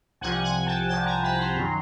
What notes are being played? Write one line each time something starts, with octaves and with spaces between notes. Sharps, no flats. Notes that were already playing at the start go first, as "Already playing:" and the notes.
C2 C3 F3 F#5 G#5
F#5 G#5
G5 A5
C2 C3 F3 G5 A5
G#5 A#5
A5 B5
A#5 C6
F#2 D#3 F#3